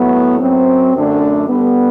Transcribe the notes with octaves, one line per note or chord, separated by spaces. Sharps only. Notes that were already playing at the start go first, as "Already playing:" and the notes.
Already playing: A2 F#3 B3
F#2 F#3 C4
F#2 D3 A3 D4
D3 G3 B3